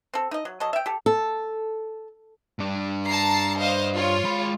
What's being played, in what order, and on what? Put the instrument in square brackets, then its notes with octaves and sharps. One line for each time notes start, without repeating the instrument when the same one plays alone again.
[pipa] C4 A4
D#4 D#5
F#3
F#3 A4 D#5
E5 G5
G4 A4
[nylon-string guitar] A4
[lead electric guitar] G2 D4
[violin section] A5 A#5 C7
C5 D#5 F5
F4 C#5
[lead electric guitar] G#3 B5